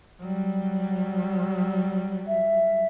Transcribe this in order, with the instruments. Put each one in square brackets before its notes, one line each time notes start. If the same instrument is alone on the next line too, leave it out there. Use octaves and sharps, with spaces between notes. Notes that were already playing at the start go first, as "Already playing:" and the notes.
[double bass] F#3 G3
[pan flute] E5